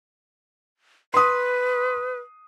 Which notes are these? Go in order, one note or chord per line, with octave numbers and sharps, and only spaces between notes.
B4 C6 D#6